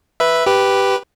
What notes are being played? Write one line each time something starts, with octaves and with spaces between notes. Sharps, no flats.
B4 E5
G4 B4